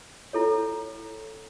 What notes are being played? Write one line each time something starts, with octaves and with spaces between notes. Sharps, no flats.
E4 A4 C#5